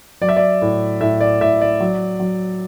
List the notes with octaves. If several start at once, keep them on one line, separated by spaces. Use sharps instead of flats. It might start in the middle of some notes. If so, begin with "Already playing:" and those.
F#3 D5
E5
D5
A2
A2 E5
D5
A2 E5
D5
F#3
F#3